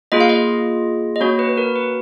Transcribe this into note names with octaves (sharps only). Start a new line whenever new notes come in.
A#3 F4 G#4 D#5
F5
D#5
D#5
A#3 C#4 F#4 C#5
B4
B4
A#4
B4